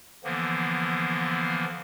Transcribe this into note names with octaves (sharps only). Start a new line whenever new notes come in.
D3 E3 F3 A#3 B3